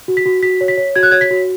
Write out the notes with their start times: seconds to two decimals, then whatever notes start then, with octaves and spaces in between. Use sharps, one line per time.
0.08 F#4
0.17 B6
0.26 F#4
0.43 F#4 B6
0.61 C#5
0.68 B6
0.77 C#5
0.96 F#4 G#6
1.03 F#6
1.11 C#5 G#6
1.21 B6
1.31 F#4